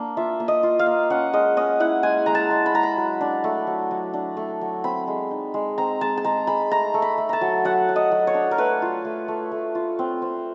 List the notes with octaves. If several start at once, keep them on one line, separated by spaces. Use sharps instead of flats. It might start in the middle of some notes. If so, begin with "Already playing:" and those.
Already playing: A#3 D4
F4 E5
A#3
D#5
F4
F5
A#3
C#4 F#5
G#3 D#5
C#4 D#5
E4 F#5
G#3 G#5
G#3 A#5
A5
G#3
B5
G#3 A#5
B5
F#3
D4
A3
F#3
F#3
D4
A3
F#3
C4 B5
G#3
D#4
G#3
C4 A#5
G#3 A5
A5
G#3 A#5
G#3 B5
A3 A#5
A3
B5
A3
A5 A#5
F#3
F#3 F#5
F#3
D#5
F#3
C#5
D4
A#4
A3 B4
F4
A3
A3
A3
F4
C4
C4